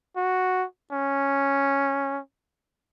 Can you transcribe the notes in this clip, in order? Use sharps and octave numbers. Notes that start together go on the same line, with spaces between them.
F#4
C#4